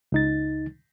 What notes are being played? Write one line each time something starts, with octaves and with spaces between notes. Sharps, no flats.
C#2 D#4 A6